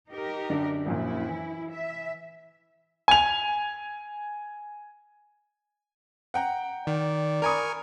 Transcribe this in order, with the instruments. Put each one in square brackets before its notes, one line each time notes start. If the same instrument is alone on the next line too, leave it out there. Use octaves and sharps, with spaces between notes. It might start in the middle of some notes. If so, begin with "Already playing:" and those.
[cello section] D#4 G4 A#4
[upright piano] F#2 D3 D4
[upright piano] A#1 F#2 A#2 [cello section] E4
[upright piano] E3
[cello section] E5
[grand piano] G#5 F7
F#5 G5 A#5
[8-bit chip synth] D#3 [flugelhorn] D5
[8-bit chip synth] A#4 G#5 C#6 [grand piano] A#5 B5 D#6